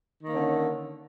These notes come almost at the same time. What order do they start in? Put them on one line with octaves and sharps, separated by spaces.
D#3 A#3 C#4 D3